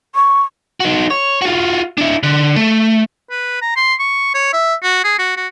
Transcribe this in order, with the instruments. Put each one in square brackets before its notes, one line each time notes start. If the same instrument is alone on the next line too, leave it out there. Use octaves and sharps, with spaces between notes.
[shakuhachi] C#6
[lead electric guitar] D#4 F#4
C#5
F4 F#4
D4 E4
D3
A3
[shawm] B4
A#5
C6
C#6
C#5
E5
F#4
G#4
F#4
F#4